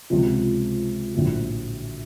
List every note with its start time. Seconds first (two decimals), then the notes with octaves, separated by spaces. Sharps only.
0.10 C#2 C3 F3
1.14 A#1 A2 F#3